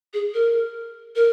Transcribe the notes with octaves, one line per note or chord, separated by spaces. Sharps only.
G#4
A#4
A#4